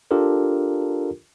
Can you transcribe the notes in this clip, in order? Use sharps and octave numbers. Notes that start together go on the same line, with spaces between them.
D4 F4 G4 A4 A#4